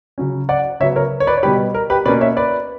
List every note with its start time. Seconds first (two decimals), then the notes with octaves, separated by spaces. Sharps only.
0.18 C#3 F#3 C#4
0.49 D5 F#5
0.80 C#3 F#3 B3 C#5 E5
0.96 A#4 C#5
1.20 C#5
1.27 B4 D5
1.37 C#5
1.43 B2 G3 B3 G4 B4
1.74 A#4
1.90 G4 B4
2.05 B2 A#3 C#4 B4 D5
2.21 C#5 E5
2.37 B4 D5